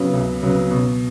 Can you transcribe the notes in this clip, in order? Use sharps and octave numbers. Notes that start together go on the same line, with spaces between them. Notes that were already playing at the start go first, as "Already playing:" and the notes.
Already playing: C#3 F#3 B3
C#2
C#3 F#3 B3
B2